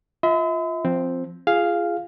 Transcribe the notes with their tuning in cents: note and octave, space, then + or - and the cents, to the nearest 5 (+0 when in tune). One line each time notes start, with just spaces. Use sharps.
F4 +0 E5 -40 B5 +45
F3 +0 C4 +0
F4 -30 G#4 -5 F5 +0